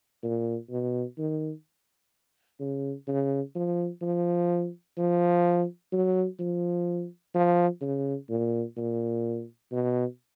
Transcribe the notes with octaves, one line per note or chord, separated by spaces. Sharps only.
A#2
B2
D#3
C#3
C#3
F3
F3
F3
F#3
F3
F3
C#3
A#2
A#2
B2